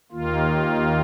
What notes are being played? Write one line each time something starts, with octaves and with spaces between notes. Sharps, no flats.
D#2 D#3 A#3 F4